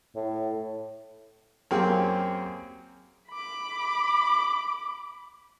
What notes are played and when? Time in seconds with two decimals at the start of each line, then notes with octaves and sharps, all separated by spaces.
0.16 A2
1.71 F#2 A#3 C4 G4 G#4 G5
3.29 B5 D6